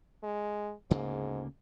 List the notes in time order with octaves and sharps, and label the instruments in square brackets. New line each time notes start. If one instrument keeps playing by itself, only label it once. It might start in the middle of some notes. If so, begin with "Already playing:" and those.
[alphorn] G#3
[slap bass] D2 C#3 A#3 [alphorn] G#2